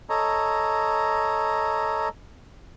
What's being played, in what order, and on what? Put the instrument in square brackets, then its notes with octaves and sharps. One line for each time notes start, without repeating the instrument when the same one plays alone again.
[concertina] A4 C#5 D#5 A#5